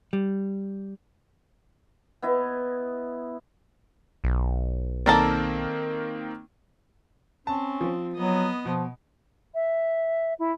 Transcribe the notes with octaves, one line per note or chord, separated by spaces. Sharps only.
G3
B3 E4 D#5
B1
D#3 A#3 C4 A4 A#4 D5
C4 C#4 A5
F3
F#3 B3 D#5
B2 F3
E5
E4